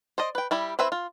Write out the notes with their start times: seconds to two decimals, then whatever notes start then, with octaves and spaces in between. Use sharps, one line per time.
0.18 C5 D5 D#5
0.35 B4 G5
0.51 G3 E4 G4
0.79 C4 E4 B4 C5 E5
0.92 F4